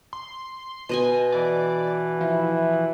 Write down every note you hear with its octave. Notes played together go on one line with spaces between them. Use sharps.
C6
B2 D#5 G#5
E3 D5
F3 E4